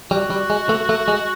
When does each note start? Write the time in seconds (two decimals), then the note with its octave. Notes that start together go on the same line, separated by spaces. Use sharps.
0.11 G3 F#4
0.30 G3
0.50 G#3
0.69 A3
0.89 A3
1.08 G#3